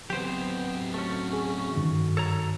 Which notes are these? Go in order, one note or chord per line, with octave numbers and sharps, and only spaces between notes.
F#3 B3 C4 G4 C5
A3 C#4 F#4
G#4
G2 D#3
A4 C#5 A#5